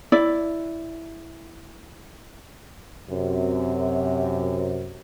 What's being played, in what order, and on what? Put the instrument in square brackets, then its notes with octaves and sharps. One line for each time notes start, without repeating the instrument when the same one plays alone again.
[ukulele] E4 D5
[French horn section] F#2 C3